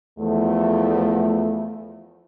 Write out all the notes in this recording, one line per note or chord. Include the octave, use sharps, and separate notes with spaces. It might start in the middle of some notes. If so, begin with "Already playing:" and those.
E2 F3 A3